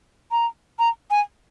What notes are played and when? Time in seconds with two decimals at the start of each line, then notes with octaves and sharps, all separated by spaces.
0.31 A#5
0.79 A#5
1.11 G#5